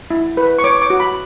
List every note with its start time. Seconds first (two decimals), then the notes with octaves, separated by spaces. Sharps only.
0.11 E4
0.37 B4
0.59 C#6
0.64 C#5 D6
0.82 D6
0.90 F#4
1.00 B5